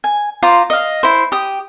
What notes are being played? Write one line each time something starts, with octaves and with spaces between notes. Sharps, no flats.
G#5
F4 C5 A#5 D6
D#5 F5
E4 C5
G4 D#6